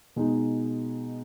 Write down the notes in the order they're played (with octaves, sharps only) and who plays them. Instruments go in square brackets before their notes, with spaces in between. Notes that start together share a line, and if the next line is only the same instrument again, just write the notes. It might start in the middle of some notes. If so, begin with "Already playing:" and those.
[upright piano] B2 G#3 D#4